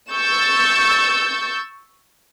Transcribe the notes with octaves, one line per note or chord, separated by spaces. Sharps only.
C#6 E6 G6 A6